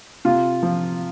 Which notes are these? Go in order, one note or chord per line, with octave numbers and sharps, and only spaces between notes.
C3 F4
F3